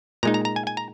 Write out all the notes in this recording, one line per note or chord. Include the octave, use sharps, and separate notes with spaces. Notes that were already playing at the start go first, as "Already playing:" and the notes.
A#2 G#3 D#4 A#5
A#5
A#5
G#5
G#5
A#5